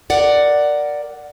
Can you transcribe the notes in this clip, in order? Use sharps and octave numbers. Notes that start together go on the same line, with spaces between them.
A#4 D5 F#5